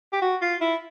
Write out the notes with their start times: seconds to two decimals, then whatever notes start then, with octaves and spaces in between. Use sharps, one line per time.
0.13 G4
0.22 F#4
0.42 F4
0.61 E4